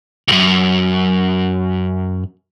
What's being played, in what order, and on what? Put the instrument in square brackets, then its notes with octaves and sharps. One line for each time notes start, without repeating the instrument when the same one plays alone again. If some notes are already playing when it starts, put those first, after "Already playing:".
[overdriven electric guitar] C#2 F#2